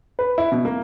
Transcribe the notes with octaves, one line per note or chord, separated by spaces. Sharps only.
B4
E4
B2
A#3